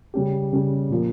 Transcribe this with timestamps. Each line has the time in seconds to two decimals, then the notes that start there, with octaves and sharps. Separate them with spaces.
0.14 C#3 G3 C#4 G4
0.53 C#3 G3 C#4 G4
0.90 A#2 F3 A#3